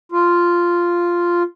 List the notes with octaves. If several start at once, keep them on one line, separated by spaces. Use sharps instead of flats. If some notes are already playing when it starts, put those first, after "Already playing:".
F4